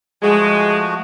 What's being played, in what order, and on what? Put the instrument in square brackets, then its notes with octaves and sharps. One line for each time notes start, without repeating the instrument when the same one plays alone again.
[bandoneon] F3 A3 F#4 [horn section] G#3